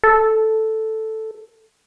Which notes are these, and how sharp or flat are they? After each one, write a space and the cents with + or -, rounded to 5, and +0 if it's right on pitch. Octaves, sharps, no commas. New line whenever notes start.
A4 +0